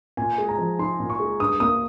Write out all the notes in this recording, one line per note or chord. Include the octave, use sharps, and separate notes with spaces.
A#2 G#5
G#3
A#5
F3
D#4 C6
A#2
C#6
G#3
G2 D#6
A#3 D#6